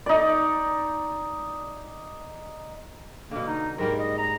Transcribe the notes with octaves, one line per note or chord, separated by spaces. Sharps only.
D#4 D5
B2 D3 A#3
D#4
G#2 G3 A#3 A#4
D#5
A#5